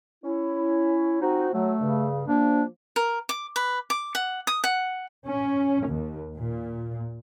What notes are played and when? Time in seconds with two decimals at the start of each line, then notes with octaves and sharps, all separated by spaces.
0.24 C#4 E4
1.21 F3 C4 D#4 F#4
1.53 F#3 A3
1.80 G2 C#3
2.28 F3 A#3 D4
2.96 A#4
3.29 D6
3.56 B4
3.90 D6
4.15 F#5
4.47 D#6
4.64 F#5
5.26 C#4
5.87 D#2
6.37 A#2